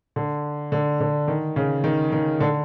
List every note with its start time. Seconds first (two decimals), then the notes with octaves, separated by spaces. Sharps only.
0.16 D3
0.72 D3
1.00 D3
1.28 D#3
1.56 C#3
1.84 D#3
2.12 D#3
2.40 D3